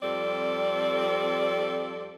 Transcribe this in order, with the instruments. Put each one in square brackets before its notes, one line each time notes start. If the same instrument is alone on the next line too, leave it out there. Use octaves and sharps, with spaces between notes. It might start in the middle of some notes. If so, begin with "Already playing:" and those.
[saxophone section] F2 G3 C4 A4 D5